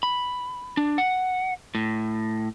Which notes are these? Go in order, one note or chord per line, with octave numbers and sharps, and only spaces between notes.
B5
D4
F#5
A2